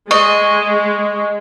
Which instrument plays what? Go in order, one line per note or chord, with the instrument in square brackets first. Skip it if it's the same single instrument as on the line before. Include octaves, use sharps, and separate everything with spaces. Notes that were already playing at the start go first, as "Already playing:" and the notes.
[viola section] G#3 [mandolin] D#5 [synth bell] C#6